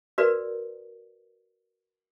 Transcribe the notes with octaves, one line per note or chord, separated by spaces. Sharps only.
F#4 A#4 B4 D5